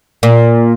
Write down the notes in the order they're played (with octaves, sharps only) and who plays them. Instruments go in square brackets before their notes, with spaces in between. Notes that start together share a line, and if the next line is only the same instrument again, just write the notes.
[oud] A#2